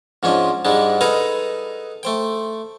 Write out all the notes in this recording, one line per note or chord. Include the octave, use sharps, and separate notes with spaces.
G#2 F3 C#4 D4 C5
G#2 G3 G#3 D4
D#4 G#4 A4 B4 F5 A#5
A3 C5 G5